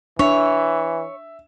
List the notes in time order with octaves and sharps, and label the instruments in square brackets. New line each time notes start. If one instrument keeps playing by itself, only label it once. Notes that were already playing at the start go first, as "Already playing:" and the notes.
[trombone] E3 [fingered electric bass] D4 [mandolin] C#5 [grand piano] E5